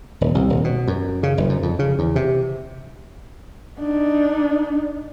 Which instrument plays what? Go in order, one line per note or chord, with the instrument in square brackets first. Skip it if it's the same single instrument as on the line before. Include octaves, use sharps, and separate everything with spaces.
[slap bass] D#1
C2
D#1
B2
F#2
C#3
F#1
F#2
F2
C#3
E2
C3
[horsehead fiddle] D4 D#4